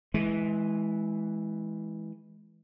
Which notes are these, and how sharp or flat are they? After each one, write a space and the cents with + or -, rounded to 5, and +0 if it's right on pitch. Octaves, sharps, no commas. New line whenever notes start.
E3 -10 G#3 +20